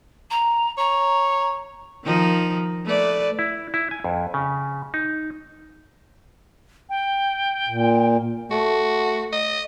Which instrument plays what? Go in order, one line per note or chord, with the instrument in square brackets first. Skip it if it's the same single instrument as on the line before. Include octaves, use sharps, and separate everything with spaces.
[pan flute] A#5
[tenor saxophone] C#5 [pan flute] A#5
[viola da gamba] D#3 F3 D#4
A3 B4 D5
[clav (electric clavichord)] E4
E4
G#5
F2
C#3
D#4
[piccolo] G5
[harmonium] A#2
[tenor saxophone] A3 [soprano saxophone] F#4
[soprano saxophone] D#5